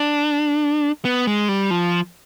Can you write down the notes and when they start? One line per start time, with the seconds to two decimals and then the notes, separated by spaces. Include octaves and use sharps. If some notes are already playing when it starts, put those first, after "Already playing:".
Already playing: D4
1.05 B3
1.27 G#3
1.49 G3
1.70 F3